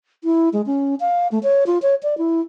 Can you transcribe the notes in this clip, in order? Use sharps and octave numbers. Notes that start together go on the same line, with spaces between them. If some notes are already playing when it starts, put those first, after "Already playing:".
E4
G#3
C#4
F5
A3
C#5
F4
C#5
D5
E4